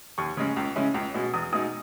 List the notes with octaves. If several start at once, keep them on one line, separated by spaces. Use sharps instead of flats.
D#2 C#6
C#3 G#3 C#4
C#2
C#3 G#3 C#4 E4
C#2
B2 G#3
E2 D#6
B2 G#3 D#4 D#6